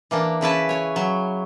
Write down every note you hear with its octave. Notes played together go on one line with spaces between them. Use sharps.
E3 A#3 D4
C#3 E4 B4 A5
C#5 G#5
F#3